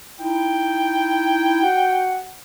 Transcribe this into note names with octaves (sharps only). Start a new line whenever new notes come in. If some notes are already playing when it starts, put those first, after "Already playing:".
D#4 E4 G5
F#4 F#5